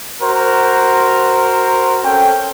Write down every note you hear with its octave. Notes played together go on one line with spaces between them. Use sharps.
F#4 A#4 C5
C4 C#4 A4 G5